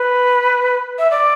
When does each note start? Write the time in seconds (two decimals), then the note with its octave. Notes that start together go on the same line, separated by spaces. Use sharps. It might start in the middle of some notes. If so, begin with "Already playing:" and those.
Already playing: B4
0.98 E5
1.11 D5